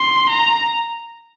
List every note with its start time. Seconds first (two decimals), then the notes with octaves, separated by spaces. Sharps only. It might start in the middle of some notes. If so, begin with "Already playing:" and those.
Already playing: C6
0.29 A#5